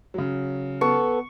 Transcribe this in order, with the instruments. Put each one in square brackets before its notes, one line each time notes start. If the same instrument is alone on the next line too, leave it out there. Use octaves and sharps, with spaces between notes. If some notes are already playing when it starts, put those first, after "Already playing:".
[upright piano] C#3 F#3
[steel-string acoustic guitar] B3 A4 [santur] C#6